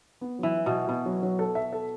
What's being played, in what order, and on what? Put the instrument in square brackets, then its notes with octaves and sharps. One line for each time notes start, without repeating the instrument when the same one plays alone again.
[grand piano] B3
[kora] E3 [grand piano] F#3
[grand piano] F#3
[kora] B2
[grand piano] F#4
[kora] B2 [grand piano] B3
[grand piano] F#3
F#3
A4
E5
A4